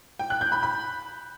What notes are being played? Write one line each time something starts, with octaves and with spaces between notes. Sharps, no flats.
G5
F#6
G6
B5
B5